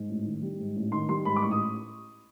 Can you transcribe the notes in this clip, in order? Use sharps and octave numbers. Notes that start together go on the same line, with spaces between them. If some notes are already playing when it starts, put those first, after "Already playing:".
Already playing: G#2
A1
D#3
G3
G#2
A1
D#3 C6
G3 C6
G#2 B5
D6
A1 C#6
D#6